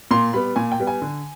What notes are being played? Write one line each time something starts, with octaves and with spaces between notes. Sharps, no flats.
A#2 C6
G3 B3 B5
A#2 G#5
G5
G3 B3
G#5
D3